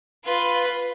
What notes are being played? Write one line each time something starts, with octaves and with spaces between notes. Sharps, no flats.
F4 B4